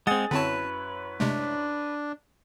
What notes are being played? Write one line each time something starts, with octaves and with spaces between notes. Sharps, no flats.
G#3 C4 G#4 F#5 D#6 A6
F#2 D3 C4 E4 B4 C#5 A5
C3 G#3 A3 D4